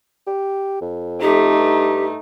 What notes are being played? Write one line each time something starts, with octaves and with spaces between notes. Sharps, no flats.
G4
F2
A3 D#4 G4
G2